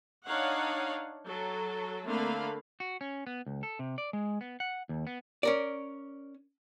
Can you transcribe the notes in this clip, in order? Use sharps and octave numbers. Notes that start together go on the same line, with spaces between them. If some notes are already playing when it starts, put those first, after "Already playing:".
D4 D#4 C#5 F5 F#5
F#3 A4
D3 A3 A#3 C4 F5 B5
F#4
C#4
B3
C#2
A4
C3
D5
G#3
B3
F#5
D#2
B3
C#4 A#4 D5